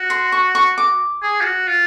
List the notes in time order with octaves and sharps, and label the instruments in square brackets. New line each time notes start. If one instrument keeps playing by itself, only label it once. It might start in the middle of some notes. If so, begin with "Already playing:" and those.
Already playing: [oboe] F#4
[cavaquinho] C6
C#6
C#6
D6
[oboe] G#4
F4
F#4
F4